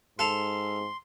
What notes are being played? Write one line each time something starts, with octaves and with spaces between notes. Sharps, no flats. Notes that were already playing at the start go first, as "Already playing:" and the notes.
G#2 A4 F5 C6